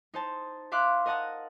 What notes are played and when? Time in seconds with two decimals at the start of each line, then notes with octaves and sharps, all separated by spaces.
0.14 D#4 C5 A5
0.72 E5 F5 C6 D6 F#6
1.06 A#4 D#5 F#5 A5 A#5 D#6